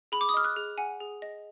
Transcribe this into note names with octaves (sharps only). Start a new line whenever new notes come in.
G#4 B5
D6
D#6
D#5 F6
F#6
G#4
F#5 G#5
G#4
D#5